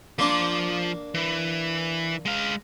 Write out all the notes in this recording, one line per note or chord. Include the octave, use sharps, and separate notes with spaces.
F3 A#3 D4 C6
E3
G#3 F5